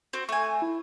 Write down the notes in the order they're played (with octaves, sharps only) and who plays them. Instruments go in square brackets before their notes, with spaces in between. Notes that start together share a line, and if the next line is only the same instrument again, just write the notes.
[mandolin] C4 F#4
[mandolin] A3 G#5 [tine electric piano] C#6
[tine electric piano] E4